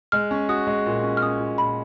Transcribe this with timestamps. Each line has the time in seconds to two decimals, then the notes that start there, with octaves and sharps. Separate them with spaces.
0.12 G#3 F6
0.31 C#4
0.49 F#4 D#6
0.67 G#3
0.86 A#2
1.03 C#4
1.17 F6
1.22 C#4 D#6
1.39 A#2
1.58 A#2 B5